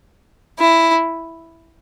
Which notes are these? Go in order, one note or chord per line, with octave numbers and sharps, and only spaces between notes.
E4